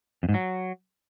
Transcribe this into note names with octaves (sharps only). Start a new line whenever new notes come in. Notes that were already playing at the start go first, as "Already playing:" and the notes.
F2
G#2
F#3